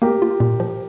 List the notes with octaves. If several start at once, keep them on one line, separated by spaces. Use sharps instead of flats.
A#3 G4 A#4
F4
A#2
F3